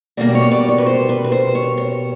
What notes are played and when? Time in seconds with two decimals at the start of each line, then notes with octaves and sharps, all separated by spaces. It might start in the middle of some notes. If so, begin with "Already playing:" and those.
0.17 B2 G3 A#3 D5
0.35 C#5
0.51 D5
0.69 C#5
0.78 B4
0.86 C5
1.09 B4
1.24 B4
1.32 C5
1.55 C#5
1.78 C#5